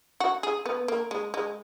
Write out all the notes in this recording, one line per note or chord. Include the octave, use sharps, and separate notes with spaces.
F#4
G#4
B3
A#3
G#3
G#3